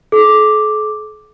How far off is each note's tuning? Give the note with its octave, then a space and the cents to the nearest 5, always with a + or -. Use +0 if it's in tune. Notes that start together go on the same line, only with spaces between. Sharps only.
A4 -45 D6 +0